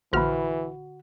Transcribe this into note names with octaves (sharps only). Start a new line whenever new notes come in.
A#1 D3 E3 F#4 G5 B5 F6